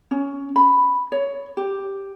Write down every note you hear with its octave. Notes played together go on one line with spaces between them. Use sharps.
C#4
B5
C#5
G4